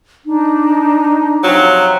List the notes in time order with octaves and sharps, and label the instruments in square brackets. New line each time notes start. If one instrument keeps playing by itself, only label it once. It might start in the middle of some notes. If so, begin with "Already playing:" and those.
[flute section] D4 D#4
[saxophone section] C3 F3 F#3
[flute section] A#5